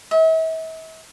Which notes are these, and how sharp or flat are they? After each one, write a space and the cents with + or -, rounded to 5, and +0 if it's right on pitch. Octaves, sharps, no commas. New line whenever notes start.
E5 -40